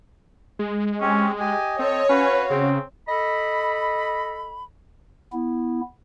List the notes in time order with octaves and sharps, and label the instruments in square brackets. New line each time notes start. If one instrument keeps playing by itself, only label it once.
[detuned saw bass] G#3
[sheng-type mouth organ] C4 G4 [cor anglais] C#4
[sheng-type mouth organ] G4 G#5 [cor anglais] D#5
[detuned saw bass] C4 [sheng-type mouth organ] A4 [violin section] C#5
[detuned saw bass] C#4 [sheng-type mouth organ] F#4 F5 [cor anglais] B4
[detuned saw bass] C#3 [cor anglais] C4
[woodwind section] A4 D#5 B5
[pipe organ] B3 E4